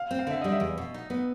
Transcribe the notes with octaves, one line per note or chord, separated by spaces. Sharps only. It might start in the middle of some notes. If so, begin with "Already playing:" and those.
Already playing: F5
C4
F5
D3 E5
G3 D#5
E5
E2
B2
D#4
B3